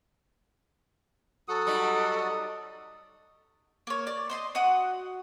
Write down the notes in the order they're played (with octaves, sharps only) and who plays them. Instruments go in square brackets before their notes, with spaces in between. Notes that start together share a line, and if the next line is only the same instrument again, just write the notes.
[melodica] F#3 F#4 F#5 [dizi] A4 [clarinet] D#6
[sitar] G3 D#4
[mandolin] A#3 C#5
D5
C5 D#5 C6
F#4 D#5 F#5 D#6